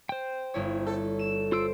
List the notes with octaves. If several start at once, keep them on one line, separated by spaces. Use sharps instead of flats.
C5 G5
G1 E4 C#5
A4
E7
F4 C5 E6 D7